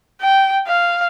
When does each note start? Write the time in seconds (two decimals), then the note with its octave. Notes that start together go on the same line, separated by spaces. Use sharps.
0.21 G5
0.67 F5